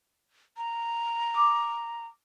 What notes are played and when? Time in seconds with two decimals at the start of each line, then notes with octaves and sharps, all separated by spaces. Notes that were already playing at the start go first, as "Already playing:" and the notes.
0.57 A#5
1.34 D6 D#6